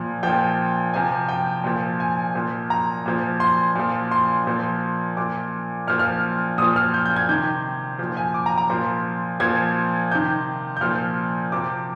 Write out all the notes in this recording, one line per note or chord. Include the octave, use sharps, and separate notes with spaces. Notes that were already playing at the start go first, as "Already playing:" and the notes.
Already playing: A#2 F3
A#2 F3 G5
C3 F3 G#5
G5
A#2 F3
G#5
A#2 F3
A#5
A#2 F3
C6
A#2 F3
C6
A#2 F3
A#2 F3 D6
A#2 F3 F6
F6
A#2 F3 D#6
F6
G6
G6
G#6
C3 D#3 G6
A#2 F3
G#5
D6
A#5
A#5
A#2 F3 C6
A#2 F3 G#6
C3 D#3 G6
G6
A#2 F3 F6
C3 F3 D6